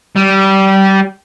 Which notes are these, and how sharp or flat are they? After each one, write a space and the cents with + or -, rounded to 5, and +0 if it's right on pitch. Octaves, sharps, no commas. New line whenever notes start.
G3 -20